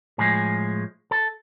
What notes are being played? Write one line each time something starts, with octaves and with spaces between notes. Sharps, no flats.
A2 F3 G#3 G#4
A4